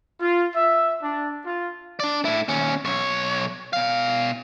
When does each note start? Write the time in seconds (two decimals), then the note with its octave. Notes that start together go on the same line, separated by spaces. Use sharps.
0.21 F4
0.55 E5
1.02 D4
1.46 F4
2.00 D4 D5
2.25 A2 E4
2.48 D#2 C#4
2.85 B1 C#5
3.73 B2 F5